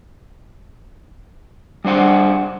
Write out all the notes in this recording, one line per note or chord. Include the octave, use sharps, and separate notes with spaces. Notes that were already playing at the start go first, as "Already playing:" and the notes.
G3 D4 C5 F#5